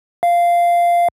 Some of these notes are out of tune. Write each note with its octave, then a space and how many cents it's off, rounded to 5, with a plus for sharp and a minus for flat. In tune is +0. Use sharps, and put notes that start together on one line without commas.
F5 -10